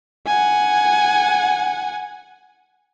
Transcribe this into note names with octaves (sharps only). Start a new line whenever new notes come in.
F#5 G#5